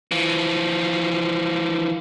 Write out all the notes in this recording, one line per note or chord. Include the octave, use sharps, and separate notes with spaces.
E3 F3